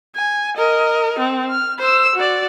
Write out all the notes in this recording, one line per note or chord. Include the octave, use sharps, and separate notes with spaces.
G#5
A#4 D#5
C4
F6
C5 E6
F#4 D5